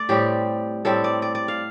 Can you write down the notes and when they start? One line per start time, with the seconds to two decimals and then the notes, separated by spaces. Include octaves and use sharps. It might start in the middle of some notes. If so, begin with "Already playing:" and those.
Already playing: A3 A4 D5
0.09 A2 G3 C4 G4
0.85 A2 G3 C4 A4
1.04 D5
1.22 D5
1.35 D5
1.48 F5